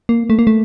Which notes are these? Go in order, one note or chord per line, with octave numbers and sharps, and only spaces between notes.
A#3
A3
A#3
A3